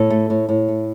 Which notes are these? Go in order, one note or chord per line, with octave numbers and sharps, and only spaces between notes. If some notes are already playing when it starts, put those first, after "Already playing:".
Already playing: A2 A4
A3
A2
A2
A3